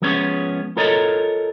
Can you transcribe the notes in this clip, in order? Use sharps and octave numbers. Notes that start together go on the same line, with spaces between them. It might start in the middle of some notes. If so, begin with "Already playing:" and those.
F3 G#3 B3 C#4 B4 C#5
F4 A4 A#4 C#5 D#5